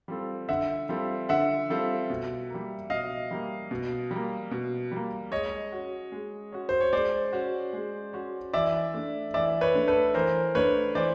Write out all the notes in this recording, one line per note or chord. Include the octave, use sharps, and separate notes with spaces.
G3 C4 F4 A4
D3 E5 F#5
G3 C4 F4 A4
D3 E5 F#5
G3 C4 F4 A4
B2
G3 A#3
B2 D#5 F5
G3 A#3
B2
G3 A#3
B2
G3 A#3
G#3 C#5 D#5
C#4 F#4
G#3
C#4 F#4
C5
C#5
G#3 C5 D5
C#4 F#4
G#3
C#4 F#4
E3 D5 E5
A3 D4
E3 D5 E5
B4 C#5
A3 D4
A4 B4
E3 A#4 C5
A3 D4 B4 C#5
E3 C5 D5